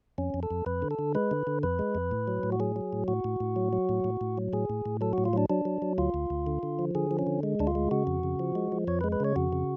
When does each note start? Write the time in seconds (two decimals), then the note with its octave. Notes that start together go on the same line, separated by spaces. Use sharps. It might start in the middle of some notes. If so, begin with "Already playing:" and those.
0.18 F2 C#4
0.34 F2
0.43 A4
0.51 F2
0.66 F2 B4
0.82 D3
0.91 A4
0.99 D3
1.15 G#3 B4
1.31 D3
1.47 D3
1.63 F2 B4
1.79 G#3
1.95 F2
2.11 A2
2.28 F#3
2.43 A2
2.52 F#4
2.60 F#3 G#4
2.76 F#3
2.93 A2
3.08 A2 F#4
3.24 A2
3.40 A2
3.56 F#3
3.73 F#3
3.89 A2
4.04 A2
4.21 A2
4.38 F#3
4.53 A2 G#4
4.70 A2
4.86 A2
5.01 F#3 A4
5.13 A2 F#4
5.25 F4
5.33 F#3 D4
5.50 F#3 D4
5.65 F#3
5.82 F#3
5.98 D2 F4
6.14 D2
6.30 D2
6.47 D3
6.63 D3
6.79 F3
6.95 D3 G#4
7.11 F3
7.19 C#4
7.27 D3
7.43 G#3
7.60 D2 D4
7.67 F4
7.75 G#3
7.91 C#3 F#4
8.07 F2
8.23 C#3
8.39 F3
8.55 G#3
8.72 F3
8.87 F2 C#5
9.01 B4
9.04 G#3
9.12 B4
9.20 C#3 C#5
9.36 F2 F#4
9.52 C#3